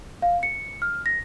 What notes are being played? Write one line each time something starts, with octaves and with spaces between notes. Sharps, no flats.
F5
C#7
F6
A#6